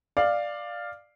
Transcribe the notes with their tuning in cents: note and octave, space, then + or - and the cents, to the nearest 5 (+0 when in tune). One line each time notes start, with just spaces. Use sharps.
D5 +10 F5 +0